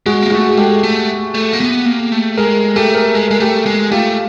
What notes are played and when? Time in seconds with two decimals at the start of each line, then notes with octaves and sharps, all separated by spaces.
0.06 G#3 F#4 G#4
0.22 A#3
0.32 A3 F#4 G#4
0.49 G#4
0.57 G#3 G4 A4
0.83 A3
1.35 A3
1.53 A#3
1.60 B3
1.85 A#3
2.12 A3
2.37 G#3 G#4 A#4
2.76 A3 G4 A4
2.95 G#4 A#4
3.14 G#3 A4
3.28 G#3 A#4
3.40 A3 G4 A4
3.66 G#3
3.91 A3 F4 G4